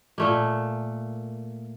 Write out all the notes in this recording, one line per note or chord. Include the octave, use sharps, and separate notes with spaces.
A#2 A3 A#3